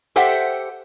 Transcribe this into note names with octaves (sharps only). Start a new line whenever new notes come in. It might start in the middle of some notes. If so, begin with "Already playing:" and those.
G4 A4 C5 E5 F#5 G5